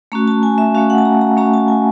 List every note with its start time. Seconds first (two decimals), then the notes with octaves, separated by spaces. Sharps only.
0.12 A3 C#4 F#4 A#5
0.28 A5
0.43 G#5
0.58 E5
0.75 A3 C#4 F#4 F5
0.90 F#5
0.98 A5
1.05 A#5
1.21 A#5
1.37 A3 C#4 F#4 A#5
1.54 A5
1.68 G#5